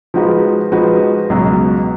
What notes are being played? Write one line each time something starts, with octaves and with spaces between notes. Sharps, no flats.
F3 G#3 D#4 F#4 B4
F3 G#3 D#4 F#4 B4
C#2 B2 F#3